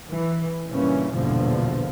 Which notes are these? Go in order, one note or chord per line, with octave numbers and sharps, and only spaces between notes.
E3
G2 A#2 C#3 E3 C#4
A#1 E2 G2 B2 D3 F3